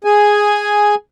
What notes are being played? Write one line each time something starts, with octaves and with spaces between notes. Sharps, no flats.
G#4 G#5